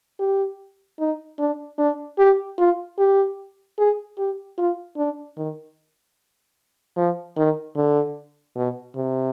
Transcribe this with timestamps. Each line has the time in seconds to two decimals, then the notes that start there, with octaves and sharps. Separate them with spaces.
0.19 G4
1.00 D#4
1.39 D4
1.78 D4
2.19 G4
2.58 F4
2.98 G4
3.78 G#4
4.18 G4
4.58 F4
4.97 D4
5.37 D#3
6.97 F3
7.37 D#3
7.76 D3
8.56 B2
8.96 C3